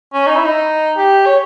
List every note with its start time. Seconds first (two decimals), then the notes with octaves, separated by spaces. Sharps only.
0.14 C#4
0.27 D#4
0.36 E4
0.45 D#4
0.97 G4
1.26 C#5